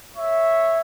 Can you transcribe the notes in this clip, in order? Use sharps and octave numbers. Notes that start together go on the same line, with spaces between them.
C#5 E5